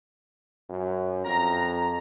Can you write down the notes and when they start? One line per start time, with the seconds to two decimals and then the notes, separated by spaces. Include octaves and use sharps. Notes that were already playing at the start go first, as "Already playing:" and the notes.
0.69 F#2
1.25 F2 A#5